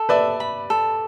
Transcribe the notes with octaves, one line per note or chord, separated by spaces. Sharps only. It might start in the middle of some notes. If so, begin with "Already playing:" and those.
Already playing: A4
B4 D5 E5
B5
A4